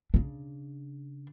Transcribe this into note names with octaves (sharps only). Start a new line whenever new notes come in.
C#3 D4